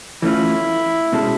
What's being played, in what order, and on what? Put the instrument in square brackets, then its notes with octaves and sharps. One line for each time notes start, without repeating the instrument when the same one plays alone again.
[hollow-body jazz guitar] E3 A3 C#4 F4 [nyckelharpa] E4
[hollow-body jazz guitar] B2 G#3 C#4 F#4 A4